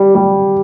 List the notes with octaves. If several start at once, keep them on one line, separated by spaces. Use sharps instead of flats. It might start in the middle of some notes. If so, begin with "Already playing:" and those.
Already playing: G3
G3